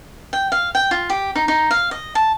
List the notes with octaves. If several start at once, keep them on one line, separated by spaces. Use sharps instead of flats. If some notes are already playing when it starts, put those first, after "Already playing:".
G5
F5
G5
F4
G4
D#4
D#4
F5
D#5
A5